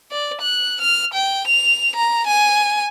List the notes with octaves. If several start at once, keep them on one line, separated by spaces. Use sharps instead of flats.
D5
F#6
F6
G5
F7
A#5
G#5